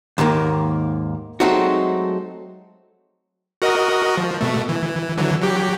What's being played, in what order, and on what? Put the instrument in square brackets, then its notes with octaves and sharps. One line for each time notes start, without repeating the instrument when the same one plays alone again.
[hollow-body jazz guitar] D#2 G#2 D#3 A#3
F#3 G#3 A3 C4 D#4 F#4
[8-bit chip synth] F#4 A#4 D#5
F3
B2 A3
E3
D3 E3 F#3
F#3 G4